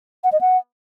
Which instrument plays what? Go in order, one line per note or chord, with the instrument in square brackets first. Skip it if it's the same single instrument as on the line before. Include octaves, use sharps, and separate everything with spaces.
[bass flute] F#5
D#5
F#5